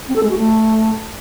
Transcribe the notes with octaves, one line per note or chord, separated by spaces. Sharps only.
C4
A4
G#3
F#4
A3